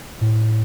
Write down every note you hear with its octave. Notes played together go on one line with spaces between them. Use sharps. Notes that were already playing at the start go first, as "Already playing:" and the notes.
A2